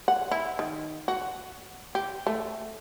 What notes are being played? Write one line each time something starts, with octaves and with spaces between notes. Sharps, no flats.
F#5
E4
D#3
F#4
G4
A3